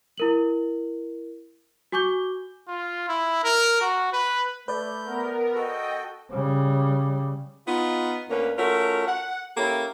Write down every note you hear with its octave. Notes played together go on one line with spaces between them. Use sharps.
E4 A#4 F#7
F#4 G#5 C#6 D6 G6 G7
F4
E4
A#4
F#4
B4
A3 B4 D5 G6
B3 A#4
F#4 A4 D#5 G5
C#3 G3
B3 D#4 F4
D2 A#3 C#4 D4 B4
A3 C#4 F4 F#4 A#4
F#5
A#3 C#4 E4 G4 A4